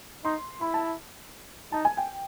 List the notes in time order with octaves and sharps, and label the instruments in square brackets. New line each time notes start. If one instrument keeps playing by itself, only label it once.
[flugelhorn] D#4 [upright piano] C6
[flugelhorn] E4 [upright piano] B5
[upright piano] A5
[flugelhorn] D#4 [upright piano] A5
[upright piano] G#5
G5